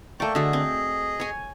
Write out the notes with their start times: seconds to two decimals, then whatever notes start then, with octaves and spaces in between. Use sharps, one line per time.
0.20 A3 A#3 D5 G5 C#6
0.35 D3 F#4 G#4 D#5
0.53 C4
1.20 C#5 G#5